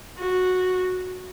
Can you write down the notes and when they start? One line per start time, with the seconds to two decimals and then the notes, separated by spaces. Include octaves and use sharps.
0.18 F#4